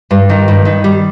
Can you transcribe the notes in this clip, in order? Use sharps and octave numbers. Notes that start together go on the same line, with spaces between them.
G2
D#3
G2
D#3
G3